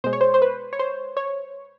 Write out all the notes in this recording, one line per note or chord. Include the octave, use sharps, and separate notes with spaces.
B2 G#3 C5
C#5
C5
C5
B4
C#5
C5
C#5